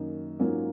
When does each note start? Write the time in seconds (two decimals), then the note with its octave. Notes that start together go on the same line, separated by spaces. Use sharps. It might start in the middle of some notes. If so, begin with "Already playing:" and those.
Already playing: F#2 D#3 A#3 D#4
0.39 G#2 F#3 A#3 C#4 F4